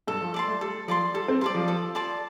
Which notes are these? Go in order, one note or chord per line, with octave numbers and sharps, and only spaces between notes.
G2 A4
F3
D5 A5 C6
A3
G3 A4
F3 D5 A5 C6
G3 A4
C4
G3 D5 A5 C6
F3
A4
D5 A5 C6